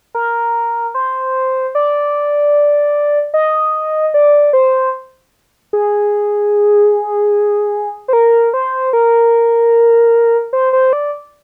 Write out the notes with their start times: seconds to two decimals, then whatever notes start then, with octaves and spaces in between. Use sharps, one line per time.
0.15 A#4
0.94 C5
1.75 D5
3.34 D#5
4.14 D5
4.53 C5
5.73 G#4
8.08 C5
8.13 A#4
8.54 C5
8.93 A#4
10.53 C5
10.73 C5
10.93 D5